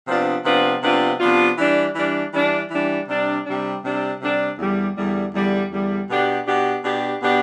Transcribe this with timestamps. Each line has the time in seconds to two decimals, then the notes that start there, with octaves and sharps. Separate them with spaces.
0.08 C3 F3 B3 D4 F4
0.45 C3 F3 B3 D4 F4
0.83 C3 F3 B3 D4 F4
1.20 C3 F3 B3 D4 F4
1.58 E3 G3 D4
1.95 E3 G3 D4
2.34 E3 G3 D4
2.70 E3 G3 D4
3.09 C3 G3 D4
3.46 C3 G3 D4
3.83 C3 G3 D4
4.21 C3 G3 D4
4.58 E2 D3 G3
4.97 E2 D3 G3
5.34 E2 D3 G3
5.72 E2 D3 G3
6.10 B2 B3 D4 G4
6.47 B2 B3 D4 G4
6.84 B2 B3 D4 G4
7.23 B2 B3 D4 G4